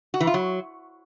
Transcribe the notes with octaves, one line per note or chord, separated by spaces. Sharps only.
F#4
E3
F4
F#3